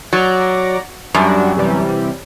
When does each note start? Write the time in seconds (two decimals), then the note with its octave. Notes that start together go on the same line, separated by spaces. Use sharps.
0.13 F#3 D5 A#5
1.14 F#2 G3 D4 F#4
1.57 C3 E3 G3